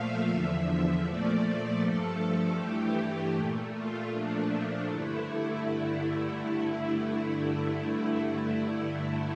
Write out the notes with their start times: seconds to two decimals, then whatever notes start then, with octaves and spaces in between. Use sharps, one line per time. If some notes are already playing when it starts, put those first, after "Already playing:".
Already playing: A#2 F3 A3 E5 F5
0.28 E2 D3 F3 E5
1.05 A#2 F3 A3 D5
1.81 G2 F3 A3 A4
2.58 G2 E3 A3 G4
3.35 A#2 A3
3.73 F4
4.11 A#2 F3 A3 D4
4.50 D4
4.88 G2 D3 A3 E4